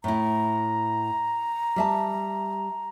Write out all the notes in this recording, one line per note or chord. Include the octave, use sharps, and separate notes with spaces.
A2 E4 A#5
G3 E5 A5